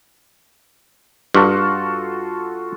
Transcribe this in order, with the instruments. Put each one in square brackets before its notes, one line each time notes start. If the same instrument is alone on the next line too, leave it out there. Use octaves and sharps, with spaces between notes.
[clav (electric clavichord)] G2 [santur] F4 F#4 A4